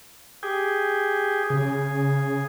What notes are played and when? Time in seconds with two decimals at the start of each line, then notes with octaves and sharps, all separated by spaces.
0.43 G4 G#4
1.50 C#3 G#4